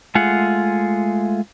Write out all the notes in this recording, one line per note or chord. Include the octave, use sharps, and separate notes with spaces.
G#3 A3 F4 G#4 F#5